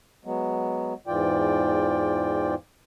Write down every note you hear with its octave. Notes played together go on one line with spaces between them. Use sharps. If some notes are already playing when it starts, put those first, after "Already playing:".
F#3 G#3 B3
E2 G#2 E3 F4 D5 G5